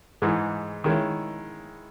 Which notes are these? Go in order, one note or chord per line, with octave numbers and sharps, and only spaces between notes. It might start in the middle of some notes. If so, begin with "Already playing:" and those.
G#2 E3 G#3 D#4
D#3 G#3 C#4 E4